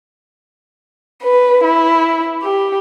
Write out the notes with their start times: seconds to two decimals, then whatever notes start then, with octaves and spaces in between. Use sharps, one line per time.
1.24 B4
1.64 E4
2.42 G4